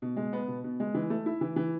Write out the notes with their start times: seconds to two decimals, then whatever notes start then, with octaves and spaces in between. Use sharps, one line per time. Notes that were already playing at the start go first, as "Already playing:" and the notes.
0.02 B2
0.17 G#3
0.33 B3
0.48 B2
0.64 B2
0.80 G#3
0.94 E3
1.10 A3
1.26 E4
1.41 E3
1.56 E3